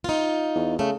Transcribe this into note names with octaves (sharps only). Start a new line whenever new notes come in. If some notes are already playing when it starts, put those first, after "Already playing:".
D#4 F4
E2
C#3 A3